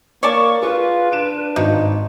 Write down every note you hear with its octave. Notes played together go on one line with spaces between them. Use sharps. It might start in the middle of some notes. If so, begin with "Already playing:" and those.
A#3 A#4 C#5 D5 A5 C#6
F4 G#4 B4
D4 D7 E7
G#1 D#4